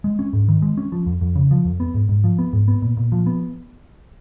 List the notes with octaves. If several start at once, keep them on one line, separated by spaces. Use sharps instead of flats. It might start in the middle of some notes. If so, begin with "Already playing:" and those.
G#3
C#4
G#2
D#3
G#3
C#4
F3
F2
F2
C#3
F3
F2
B3
G#2
G#2
F3
B3
G#2
B3
A#2
A#2
F3
B3